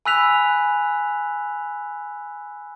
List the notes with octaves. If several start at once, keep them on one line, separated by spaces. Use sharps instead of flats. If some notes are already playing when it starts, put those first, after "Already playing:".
G#5 B5 E6 F#6 B6 F7